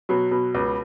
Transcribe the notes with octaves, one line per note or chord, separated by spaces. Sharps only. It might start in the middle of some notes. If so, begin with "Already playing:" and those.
B2 F#3
B2
C#2